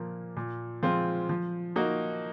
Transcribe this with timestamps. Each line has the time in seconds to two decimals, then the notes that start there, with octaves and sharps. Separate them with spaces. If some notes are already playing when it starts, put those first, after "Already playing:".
Already playing: A#2 F3 A#3
0.37 A#2
0.83 F3 G#3 C4 F4
1.29 F3
1.76 A#3 D#4 F#4